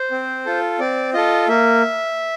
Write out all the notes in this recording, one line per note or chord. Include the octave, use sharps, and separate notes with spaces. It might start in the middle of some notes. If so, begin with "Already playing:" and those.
Already playing: C5
C4
F4 A4
C4 D5
F4 A4 D#5
A#3 E5